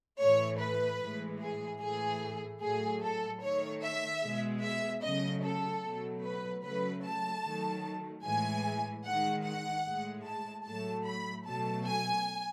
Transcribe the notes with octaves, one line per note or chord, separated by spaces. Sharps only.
A2 E3 A3 C#5
B4
A2 E3 G#3
G#4
A2 E3 A3 G#4
A2 F#3 A3 G#4
A4
D#3 A3 C#5
E5
B2 G#3
E5
C#3 F#3 A3 D#5
A4
B2 F#3 A3
B4
C#3 F#3 A3 B4
A5
D#3 F#3 A3
A2 E3 G#3 G#5
D#3 G#3 F#5
F#5
A2 G#3
A5
A2 F#3 A3 A5
B5
B2 F#3 A3 A5
G#5